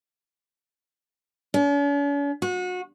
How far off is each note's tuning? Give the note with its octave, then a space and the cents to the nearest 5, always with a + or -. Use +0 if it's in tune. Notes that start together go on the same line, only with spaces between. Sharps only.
C#4 +45
F#4 -30